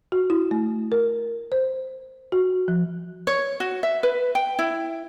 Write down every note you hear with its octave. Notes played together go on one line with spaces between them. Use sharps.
F#4
E4
A3
A#4
C5
F#4
F3
C#5
F#4
E5
B4
G5
E4